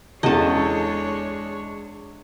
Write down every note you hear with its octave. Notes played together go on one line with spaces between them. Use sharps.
E2 C#3 G#3 D4 A4 C#5 D#5